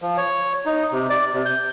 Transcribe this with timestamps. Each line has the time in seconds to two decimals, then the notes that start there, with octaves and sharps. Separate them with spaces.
0.02 F3
0.17 C#5
0.66 D#4
0.92 C3
1.10 D5
1.34 C3
1.46 G6